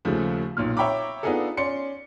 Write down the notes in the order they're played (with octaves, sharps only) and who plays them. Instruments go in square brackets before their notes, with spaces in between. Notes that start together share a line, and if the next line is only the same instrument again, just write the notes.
[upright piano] D#2 C#3 F3 A3
B1 A#2 F6
C#5 E5 G5 A#5 B5 D6
B3 D4 D#4 F4 G#4 A4
C#4 D5 C6 C#7